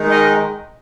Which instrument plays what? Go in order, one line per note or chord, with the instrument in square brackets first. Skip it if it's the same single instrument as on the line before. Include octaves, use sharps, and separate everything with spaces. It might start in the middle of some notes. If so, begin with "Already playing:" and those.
Already playing: [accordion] D#3 G#3 D#4
A#4 D#5
A#4